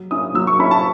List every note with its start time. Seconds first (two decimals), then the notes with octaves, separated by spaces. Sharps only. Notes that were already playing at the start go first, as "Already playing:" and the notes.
Already playing: F#3
0.11 C#4 E4 D#6
0.34 F#3 E6
0.47 C#6
0.59 C#4 E4 B5
0.71 A5